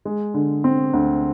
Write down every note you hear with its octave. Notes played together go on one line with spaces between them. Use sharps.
G#3
D3
C4
D2